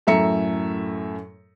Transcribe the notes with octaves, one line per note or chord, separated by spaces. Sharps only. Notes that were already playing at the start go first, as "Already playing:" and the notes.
F#2 A2 A4 E5 A#5 C#7